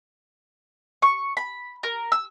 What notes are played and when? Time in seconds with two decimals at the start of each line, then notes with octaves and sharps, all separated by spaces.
1.02 C#6
1.37 B5
1.83 A#4
2.12 E6